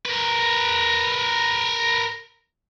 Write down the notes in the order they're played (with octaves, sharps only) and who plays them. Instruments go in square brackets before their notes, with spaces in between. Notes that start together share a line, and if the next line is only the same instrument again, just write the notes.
[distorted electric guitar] A#4 B4